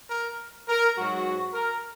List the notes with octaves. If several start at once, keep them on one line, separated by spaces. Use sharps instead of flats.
A#4
A#4
G#2 F#3 F#4
A#4